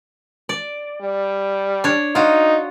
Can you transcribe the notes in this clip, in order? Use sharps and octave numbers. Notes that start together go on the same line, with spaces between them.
D5
G3
D4 C#5
D#4 F4 F#4